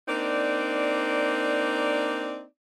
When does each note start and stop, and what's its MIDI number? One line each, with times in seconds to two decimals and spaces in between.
0.09 2.44 58
0.09 2.44 60
0.09 2.44 62
0.09 2.44 63
0.09 2.44 74